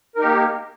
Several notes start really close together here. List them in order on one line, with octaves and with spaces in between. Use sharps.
A#4 D#4 G4 A#3